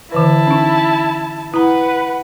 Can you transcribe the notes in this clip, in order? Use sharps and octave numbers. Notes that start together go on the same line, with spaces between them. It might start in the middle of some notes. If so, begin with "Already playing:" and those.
D3 E3 E4 B4 A5
C#4 D#4
E4 B4 F#5 A#5